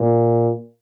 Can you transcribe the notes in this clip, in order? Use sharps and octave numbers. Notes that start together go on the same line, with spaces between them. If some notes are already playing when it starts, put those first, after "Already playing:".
Already playing: A#2